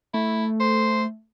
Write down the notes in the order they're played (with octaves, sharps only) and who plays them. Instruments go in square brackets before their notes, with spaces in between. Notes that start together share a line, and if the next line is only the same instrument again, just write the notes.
[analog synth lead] A3 [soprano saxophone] E4
[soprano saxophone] C5